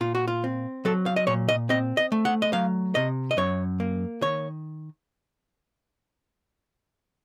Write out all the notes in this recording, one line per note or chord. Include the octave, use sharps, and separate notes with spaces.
A#2 F4
F#4
F4
C4
F#3 A4
F5
D#5
A#2 C#5
D#5
C4 D#5
D#5
A3
F#5
D#5
F#3 F5
C3 D#5
D#5
F#2 C#5
A#3
D#3 C#5